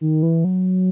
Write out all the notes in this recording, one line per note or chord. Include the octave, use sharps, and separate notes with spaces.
D#3
E3
F#3